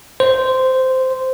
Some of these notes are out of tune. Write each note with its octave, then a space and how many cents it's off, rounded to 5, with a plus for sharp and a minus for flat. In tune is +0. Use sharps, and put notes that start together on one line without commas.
C5 -10